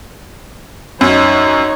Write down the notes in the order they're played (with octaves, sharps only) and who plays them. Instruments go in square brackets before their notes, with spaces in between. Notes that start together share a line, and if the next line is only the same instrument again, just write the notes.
[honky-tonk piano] F#2 [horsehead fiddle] D#4 C#5